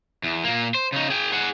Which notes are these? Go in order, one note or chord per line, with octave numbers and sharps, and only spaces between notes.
E2
A#2 A#3
C5
C#3 D#4
G#4 G5
G#4 F#5